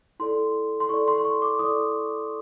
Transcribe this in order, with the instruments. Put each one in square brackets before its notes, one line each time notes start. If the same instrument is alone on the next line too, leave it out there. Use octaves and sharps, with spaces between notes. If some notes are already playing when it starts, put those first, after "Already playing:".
[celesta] E4 A4 D5 C6
C6
E4 A4 D5 C#6
C6
C6
C#6
D6
E4 A4 D5 D#6